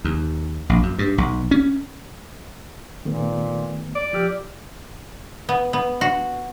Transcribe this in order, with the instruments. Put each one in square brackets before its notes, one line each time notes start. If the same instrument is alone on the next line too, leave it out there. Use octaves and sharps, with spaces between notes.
[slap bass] D#2
A#1
F#2
G2
B1
C#4
[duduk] A#2 [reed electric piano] D#3 A3 B3
[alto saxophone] D5
[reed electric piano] F3 E6 F6 [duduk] G4
[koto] B3
B3
F#4